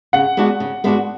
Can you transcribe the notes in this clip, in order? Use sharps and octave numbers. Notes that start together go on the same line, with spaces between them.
C#3 F#5
G#3 B3 D4 F#4
C#3
G#3 B3 D4 F#4